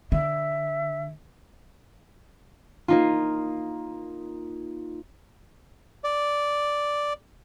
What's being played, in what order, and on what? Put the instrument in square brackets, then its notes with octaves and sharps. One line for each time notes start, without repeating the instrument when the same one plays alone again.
[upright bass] D3 [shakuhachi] E5
[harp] A#3 D#4 F4
[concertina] D5